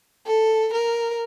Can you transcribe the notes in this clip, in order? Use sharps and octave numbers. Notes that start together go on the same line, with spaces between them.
A4
A#4